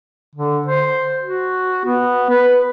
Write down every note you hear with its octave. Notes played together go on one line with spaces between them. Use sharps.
D3
C5
F#4
B3
B4